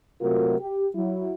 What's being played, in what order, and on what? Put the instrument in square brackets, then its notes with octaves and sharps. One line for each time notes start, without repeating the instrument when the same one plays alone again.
[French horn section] C3 F#3 A3 F4 F#4 A#4
G4
F#3 E4